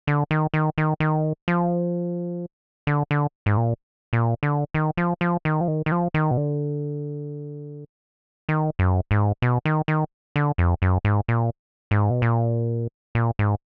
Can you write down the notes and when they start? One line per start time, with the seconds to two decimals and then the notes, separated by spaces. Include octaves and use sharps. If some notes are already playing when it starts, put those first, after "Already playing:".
0.07 D3
0.31 D#3
0.54 D#3
0.78 D#3
1.00 D#3
1.48 F3
2.87 D3
3.11 D3
3.46 G#2
3.57 A#2
4.13 A#2
4.43 D3
4.74 D#3
4.97 F3
5.21 F3
5.45 D#3
5.61 F3
5.68 D#3
5.86 D#3
5.92 F3
6.14 D#3
6.31 B2
6.37 D3
8.49 D#3
8.79 F#2
9.11 G#2
9.42 B2
9.65 D#3
9.88 D#3
10.36 D3
10.58 F2
10.82 F#2
11.05 G#2
11.28 A#2
11.91 G#2
12.10 B2
12.22 A#2
13.15 A#2
13.39 G#2